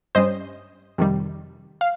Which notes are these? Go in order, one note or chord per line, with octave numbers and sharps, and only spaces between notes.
G2 G3 C#4 C5 D#5
F2 C3 D#3 G3
F5